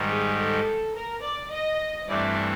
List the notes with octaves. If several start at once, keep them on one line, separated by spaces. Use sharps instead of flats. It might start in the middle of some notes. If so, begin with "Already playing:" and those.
Already playing: G#2 D#3 G3
G#4
A4
A#4
D5
D#5
G2 E3 A3 C4 D5